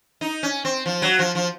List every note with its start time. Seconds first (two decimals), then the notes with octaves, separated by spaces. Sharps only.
0.21 D#4
0.43 C#4
0.65 C4
0.86 F3
1.02 F#3
1.19 F3
1.35 F3